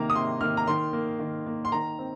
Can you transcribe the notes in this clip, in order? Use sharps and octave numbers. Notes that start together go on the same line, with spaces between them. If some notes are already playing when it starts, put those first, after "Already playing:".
Already playing: C3 D#3 A#3 A#5
D#6
C3 C6
D#3 A#3 F6
A#5
D#3 C6
A#3
D#3
A#3
C6
D#3 A#5
C4